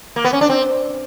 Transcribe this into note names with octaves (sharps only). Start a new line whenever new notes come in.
A#3
B3
C#4
D4
C4